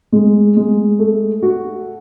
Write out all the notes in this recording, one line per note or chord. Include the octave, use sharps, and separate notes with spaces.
G#3
G#3
A3
F#4